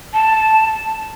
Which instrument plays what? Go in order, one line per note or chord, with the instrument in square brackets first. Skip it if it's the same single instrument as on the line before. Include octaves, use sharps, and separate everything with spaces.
[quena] A5